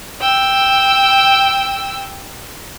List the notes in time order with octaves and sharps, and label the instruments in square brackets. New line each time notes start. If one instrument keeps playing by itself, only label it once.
[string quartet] G5 E6